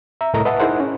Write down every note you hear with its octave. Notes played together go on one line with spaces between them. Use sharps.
E5 A#5
C2 A2 A3 A#4 D#5 A#5
B4 D#5 E5 F#5 A5
D#4 E4 G#4 A#4 C5 F#5
C#4